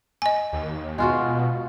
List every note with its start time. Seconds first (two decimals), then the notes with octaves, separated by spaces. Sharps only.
0.22 D#5 G#5
0.53 D#2
0.98 B2 G#3 F4 F#4